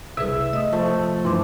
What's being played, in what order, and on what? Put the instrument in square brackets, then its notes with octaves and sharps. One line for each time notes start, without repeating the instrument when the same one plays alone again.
[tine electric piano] C2 E6 [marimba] C3 G#4 B4 [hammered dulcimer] E5
[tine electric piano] A3 [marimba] D#5 D#6
[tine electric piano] F3 [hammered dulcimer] A3
[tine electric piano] G2 E3 F3 [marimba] C6 D6